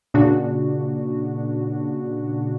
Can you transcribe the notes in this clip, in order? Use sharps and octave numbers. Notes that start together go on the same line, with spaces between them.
A#2 C#3 D4 F#4